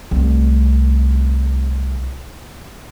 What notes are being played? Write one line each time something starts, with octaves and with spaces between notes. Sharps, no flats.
C2 A3